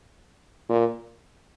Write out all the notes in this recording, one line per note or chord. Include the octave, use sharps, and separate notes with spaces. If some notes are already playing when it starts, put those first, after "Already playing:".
A#2